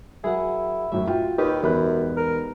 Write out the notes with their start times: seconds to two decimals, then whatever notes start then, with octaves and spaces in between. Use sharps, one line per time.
0.24 F#3 E4 G#4 A#4 F#5
0.92 F#2 A2 F#3 E5
1.08 F4 F#4 G5
1.38 D#2 D#4 G4 B4
1.63 E1 F#2 B5 F#6
2.17 A#4